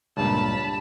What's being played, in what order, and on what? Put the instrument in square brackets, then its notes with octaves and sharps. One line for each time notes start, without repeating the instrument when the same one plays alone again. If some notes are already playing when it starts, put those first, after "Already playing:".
[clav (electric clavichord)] C#2 G2 A#2 [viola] A5 B5